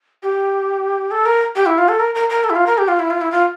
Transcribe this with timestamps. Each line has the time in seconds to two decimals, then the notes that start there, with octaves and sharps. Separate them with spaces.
0.23 G4
1.11 A4
1.26 A#4
1.56 G4
1.66 E4
1.78 F4
1.88 A4
1.99 A#4
2.15 A#4
2.30 A#4
2.44 A4
2.50 E4
2.56 F4
2.67 A#4
2.78 G4
2.88 F4
2.99 E4
3.10 F4
3.21 E4
3.32 F4